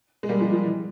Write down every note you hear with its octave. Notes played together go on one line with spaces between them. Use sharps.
G#3
G3 A#3
F3 G#3
F3
E3